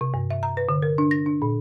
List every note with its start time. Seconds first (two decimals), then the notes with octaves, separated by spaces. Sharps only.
0.01 C3
0.14 G2
0.31 E5
0.43 A#5
0.57 B4
0.69 D3
0.82 A#4
0.98 D4
1.11 A#6
1.26 D4
1.42 A#2